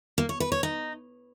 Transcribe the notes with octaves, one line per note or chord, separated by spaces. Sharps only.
A#3
C#5
B4
C#5
D#4